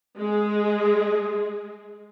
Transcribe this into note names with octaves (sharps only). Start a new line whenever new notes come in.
G#3 G#4